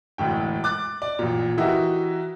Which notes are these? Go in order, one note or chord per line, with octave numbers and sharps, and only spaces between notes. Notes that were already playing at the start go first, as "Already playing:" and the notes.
E1 D2 A2 G5
D6 F#6 A6
D5
A1 A#2
E3 F#4 G4 A#4 D#5 E5